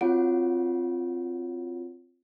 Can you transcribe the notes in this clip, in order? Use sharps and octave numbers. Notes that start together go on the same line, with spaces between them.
C4 F4 F#4 C#5 F#5 D7